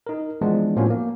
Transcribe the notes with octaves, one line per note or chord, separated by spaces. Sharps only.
D#4 A#4
E3 F3 G#3 B3 D4
A2 F3 A#3 B3 C#4 F#4
A#3